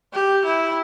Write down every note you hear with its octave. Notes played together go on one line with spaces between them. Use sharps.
G4
E4